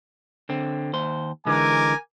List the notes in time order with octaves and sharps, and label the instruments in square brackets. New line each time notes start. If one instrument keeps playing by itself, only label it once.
[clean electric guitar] D3 C4
D#2 C5
[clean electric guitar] D3 E3 G#3 [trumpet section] A#4 G#5 D6